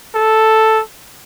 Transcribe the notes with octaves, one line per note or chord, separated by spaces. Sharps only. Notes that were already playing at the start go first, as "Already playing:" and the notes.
A4